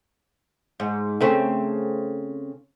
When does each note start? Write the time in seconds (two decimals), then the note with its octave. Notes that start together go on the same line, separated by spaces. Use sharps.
0.80 G#2
1.21 C#3 A3 C4